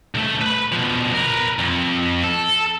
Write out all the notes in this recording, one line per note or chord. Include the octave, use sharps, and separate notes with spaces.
C#2 A3
B4 B5
B2 F3
A#4 B4
F2
A4